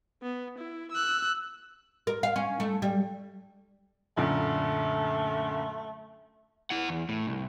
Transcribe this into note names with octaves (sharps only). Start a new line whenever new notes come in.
B3
E4
E6 F#6
A#4
F5
C#4
A3
G3
F#2 A#2 D3 A3
E4 F#5
E2
A2
C2